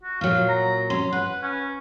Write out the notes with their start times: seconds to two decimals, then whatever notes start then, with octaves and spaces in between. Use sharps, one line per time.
0.03 F#4
0.21 A#2 F#3 F5
0.49 A#5
0.90 C#4 C6
1.13 B4 F#5
1.43 C#4